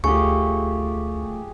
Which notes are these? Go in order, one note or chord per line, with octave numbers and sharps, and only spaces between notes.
D2 A3 F4 G4 G#4 C#6